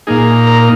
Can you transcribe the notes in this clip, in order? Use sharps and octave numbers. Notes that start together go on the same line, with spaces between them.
A#2 A#3 D#4 G#4
A#4